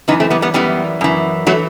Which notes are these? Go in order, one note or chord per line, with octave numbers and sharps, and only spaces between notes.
F#2 E3 B3 D#4
A3 C4
G3 B3
G3 B3
F#2 E3 G3 B3
F#2 E3
E3 F#3 A3